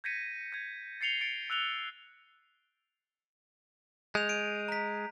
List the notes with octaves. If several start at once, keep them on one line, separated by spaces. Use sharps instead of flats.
G6 G#6 A#6 B6 C#7 D#7
G6 G#6
A6 C7 C#7 F7 G7
A6 C#7 D7
E6 F#6 F7 G7
G#3 G6 F7
D7 D#7
A#5 B6